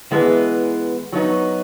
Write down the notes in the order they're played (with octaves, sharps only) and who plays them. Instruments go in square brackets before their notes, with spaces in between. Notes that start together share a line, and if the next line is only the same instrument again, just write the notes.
[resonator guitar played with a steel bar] E3 G#3 B3
F#3 B3 D#4